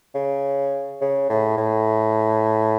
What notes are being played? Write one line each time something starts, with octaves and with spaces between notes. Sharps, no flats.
C#3
C#3
A2
A2